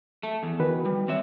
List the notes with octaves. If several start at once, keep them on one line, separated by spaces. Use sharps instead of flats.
A3
E2
D#3 F#4 B4
G3
C4 C#5 E5